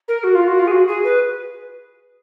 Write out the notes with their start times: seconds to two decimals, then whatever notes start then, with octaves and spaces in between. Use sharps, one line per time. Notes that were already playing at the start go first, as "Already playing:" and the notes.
0.08 A#4
0.24 F#4
0.35 F4
0.47 F#4
0.59 F4
0.67 G#4
0.72 F#4
0.88 G#4
1.04 B4